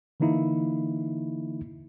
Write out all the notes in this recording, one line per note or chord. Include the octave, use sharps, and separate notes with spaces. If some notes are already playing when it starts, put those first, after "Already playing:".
D3 E3 A#3 D#4 E4